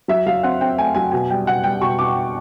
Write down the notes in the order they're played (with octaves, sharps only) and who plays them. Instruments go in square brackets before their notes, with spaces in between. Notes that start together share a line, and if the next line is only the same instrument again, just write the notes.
[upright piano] F#3 E5
F#3 F5
C4 F#5
C4 G5
A3 G#5
F#3 G#5
B2 G#5
G3 G5
B2 F#5
G3 G5
B2 C#6
B2 D6